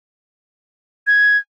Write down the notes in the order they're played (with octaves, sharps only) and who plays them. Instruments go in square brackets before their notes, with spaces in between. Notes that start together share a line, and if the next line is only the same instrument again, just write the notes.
[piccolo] G#6